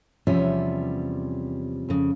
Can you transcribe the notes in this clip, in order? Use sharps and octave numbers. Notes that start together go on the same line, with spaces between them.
E2 C3 F3 G3 C#4 E5
F2 C#3